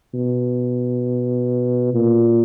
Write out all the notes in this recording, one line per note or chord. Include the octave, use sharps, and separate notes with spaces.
B2
A#2